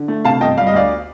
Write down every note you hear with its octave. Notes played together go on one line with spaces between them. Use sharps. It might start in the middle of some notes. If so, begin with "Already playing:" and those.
Already playing: D3
A3
C3 F5 A5
G1 D#5 G5
G3 F5
D#5
D2 D5 F5